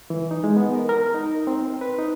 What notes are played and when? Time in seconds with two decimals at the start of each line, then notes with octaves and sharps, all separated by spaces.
0.10 E3
0.31 D#4
0.44 G#3
0.56 B3
0.76 A#4
0.89 A#4
1.14 D#4
1.47 C4
1.81 B4
1.99 D#4